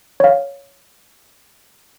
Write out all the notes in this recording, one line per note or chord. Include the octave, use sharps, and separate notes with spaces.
C#5 F5